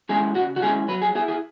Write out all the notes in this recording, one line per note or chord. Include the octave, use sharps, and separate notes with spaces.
G#3 C#4 E4 G#4
C#3 F#4
F#4
G#3 C#4 E4 G#4
F#3 B4
G#4
E4 G#4
G#4